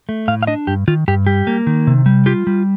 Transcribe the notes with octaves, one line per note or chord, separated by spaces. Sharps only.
A3
A2 F5
F5
D4 D#5
G2 G4
D#3 F4
G2 G4
G3 G4
A#3
D#3
C3
G3
F4 G4
G3